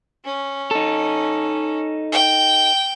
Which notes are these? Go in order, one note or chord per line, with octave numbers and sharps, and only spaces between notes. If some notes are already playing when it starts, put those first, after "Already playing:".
C#4
D#4 A4
G5